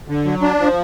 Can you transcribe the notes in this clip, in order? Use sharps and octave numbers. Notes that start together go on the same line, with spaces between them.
D3
F#3
D4
F3